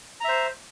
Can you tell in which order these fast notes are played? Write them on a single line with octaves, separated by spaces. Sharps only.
A#5 E5 C5